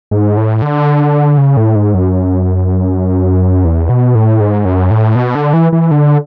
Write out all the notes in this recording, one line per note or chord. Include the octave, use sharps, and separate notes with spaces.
G#2
A2
D3
C#3
A2
G#2
F#2
E2
B2
A2
G#2
F#2
A2
B2
D3
E3
E3
D3